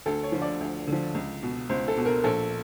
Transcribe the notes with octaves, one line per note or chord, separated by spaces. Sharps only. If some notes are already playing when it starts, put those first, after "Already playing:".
D2 A4
C#5
D3 F3
D5
D2
D3 F3
C#2
B2
C#2 C5
A4
B2
A#4
A#1 A4